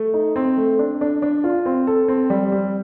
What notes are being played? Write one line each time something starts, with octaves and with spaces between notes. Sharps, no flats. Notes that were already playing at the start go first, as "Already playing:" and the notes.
Already playing: A3
D#4
C4
A3
D4
D4
D4
F4
C4
A4
C4
G3
G3